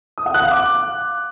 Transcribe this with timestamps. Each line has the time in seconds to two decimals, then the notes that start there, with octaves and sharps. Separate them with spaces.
0.18 D#6
0.26 F#5
0.34 F#6
0.43 F5
0.51 D6